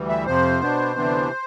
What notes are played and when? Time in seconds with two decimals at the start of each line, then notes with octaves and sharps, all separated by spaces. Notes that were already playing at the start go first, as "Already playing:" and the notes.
Already playing: D2 E3 G3
0.09 E5
0.26 F2 C3 F3 C5
0.61 B2 B3 D4
0.96 D2 C3 E3 B3 D4